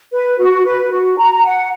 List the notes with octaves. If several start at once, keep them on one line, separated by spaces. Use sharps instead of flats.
B4
F#4
B4
F#4
A#5
F#5